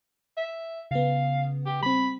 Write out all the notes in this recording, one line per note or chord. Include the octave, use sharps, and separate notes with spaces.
E5
C#3 B3 F5
G4
G3 C4 B5